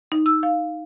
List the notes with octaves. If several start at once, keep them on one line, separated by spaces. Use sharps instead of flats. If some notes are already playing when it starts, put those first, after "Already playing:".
D#4
E6
F5